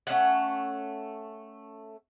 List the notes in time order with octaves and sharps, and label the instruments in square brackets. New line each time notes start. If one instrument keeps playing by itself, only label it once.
[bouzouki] A3 C#4 F5 F#5